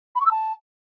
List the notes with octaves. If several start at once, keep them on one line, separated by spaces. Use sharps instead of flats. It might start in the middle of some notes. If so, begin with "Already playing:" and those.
B5
C#6
E6
A5